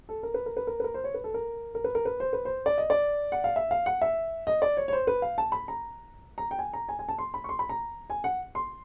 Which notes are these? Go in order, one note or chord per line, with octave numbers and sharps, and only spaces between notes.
A4
A#4
B4
A#4
B4
A#4
B4
A#4
C5
C#5
B4
A4
A#4
A#4
B4
A#4
B4
C5
B4
C5
D5
D#5
D5
F#5
F5
E5
F5
F#5
E5
D#5
D5
C#5
C#5
C5
B4
F5
A5
B5
A#5
A#5
G5
G#5
A#5
G#5
G#5
A5
C6
B5
C#6
C6
B5
A#5
G#5
F#5
C6